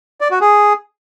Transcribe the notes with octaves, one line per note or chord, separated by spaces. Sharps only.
D5
F#4
G#4